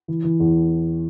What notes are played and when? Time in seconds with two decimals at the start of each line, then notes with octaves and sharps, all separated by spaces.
0.08 E3
0.24 E3
0.40 E2